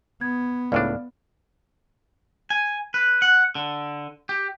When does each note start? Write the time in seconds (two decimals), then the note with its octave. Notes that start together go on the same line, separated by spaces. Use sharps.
0.21 B3 G#6
0.72 C#2 A2 D4 D5 F5 F6
2.50 G#5
2.94 B4
3.22 F#5
3.55 D3
4.29 G4